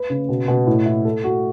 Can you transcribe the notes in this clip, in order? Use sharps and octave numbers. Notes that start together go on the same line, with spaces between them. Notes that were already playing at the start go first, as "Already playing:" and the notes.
Already playing: B4
C#3
B2
B2
A2
E4
A4
F#4